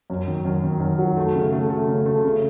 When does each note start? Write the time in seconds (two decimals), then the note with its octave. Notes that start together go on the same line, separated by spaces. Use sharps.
0.10 F#2
0.27 D#3
0.45 F#2
0.64 D#3
0.80 F#2
0.98 F#3
1.17 A3
1.35 C#3
1.52 A3
1.70 A3
1.87 C#3
2.06 A3
2.24 C#3